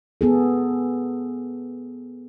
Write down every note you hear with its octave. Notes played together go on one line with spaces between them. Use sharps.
B3 G#4 A4